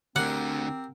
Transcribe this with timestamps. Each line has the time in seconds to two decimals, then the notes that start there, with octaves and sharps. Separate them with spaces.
0.16 D2 D3 C4 G4 A#4 F#5